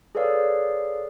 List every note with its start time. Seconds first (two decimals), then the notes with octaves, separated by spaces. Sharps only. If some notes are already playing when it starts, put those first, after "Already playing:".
0.15 G#4 A4 B4 C#5 D5 F5